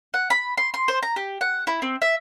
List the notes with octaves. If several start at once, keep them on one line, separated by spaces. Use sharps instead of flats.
F#5
B5
C6
C6
C5
A#5
G4
F#5
E4
C4
E5